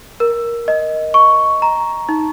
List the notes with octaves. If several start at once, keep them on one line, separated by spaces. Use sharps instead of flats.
A#4
D#5
C#6
A#5
D#4